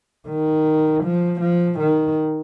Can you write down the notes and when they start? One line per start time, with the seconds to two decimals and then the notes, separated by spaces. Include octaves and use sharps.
0.28 D#3
1.04 F3
1.41 F3
1.79 D#3